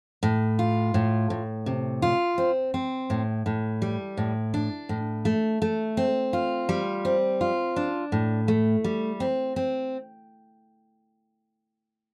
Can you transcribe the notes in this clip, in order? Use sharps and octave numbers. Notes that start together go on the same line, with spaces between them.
A2
F4
A2
A2
C3
F4
C4
C4
A2
A2
G3
A2
D4
A2
A3
A3
C4
F4
G3
C4
F4
D4
A2
A3
G3
C4
C4